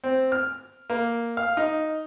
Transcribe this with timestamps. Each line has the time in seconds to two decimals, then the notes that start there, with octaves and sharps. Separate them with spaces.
0.04 C4
0.32 F6
0.90 A#3
1.37 F5
1.57 D#4